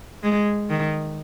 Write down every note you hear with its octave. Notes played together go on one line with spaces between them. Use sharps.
G#3
D#3